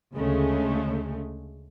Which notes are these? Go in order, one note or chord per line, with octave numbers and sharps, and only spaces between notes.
D2 C#3 G#3 A3